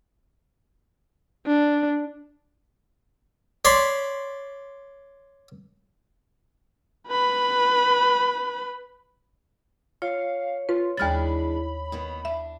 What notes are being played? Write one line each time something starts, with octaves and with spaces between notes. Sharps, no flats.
D4
C#5 D5 B5 C6
B4 B5
F4 C#5 F5
F4 B4
D#2 E3 G#3 D4 B5 F6 A6
D#3 A#3 B3
D4 E5